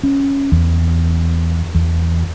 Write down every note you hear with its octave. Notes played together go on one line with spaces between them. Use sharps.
C#4
E2
E2